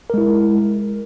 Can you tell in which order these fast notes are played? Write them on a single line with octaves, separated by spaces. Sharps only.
A#4 G#3 E4